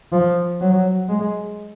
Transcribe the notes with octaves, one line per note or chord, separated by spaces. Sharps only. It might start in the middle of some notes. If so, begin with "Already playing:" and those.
F3
F#3
G#3